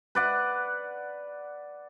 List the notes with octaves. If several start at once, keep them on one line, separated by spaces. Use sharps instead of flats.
B4 D5 F#5